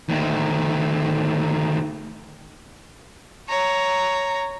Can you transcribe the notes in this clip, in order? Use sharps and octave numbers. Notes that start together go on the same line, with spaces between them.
D2 D#3
C#5 A#5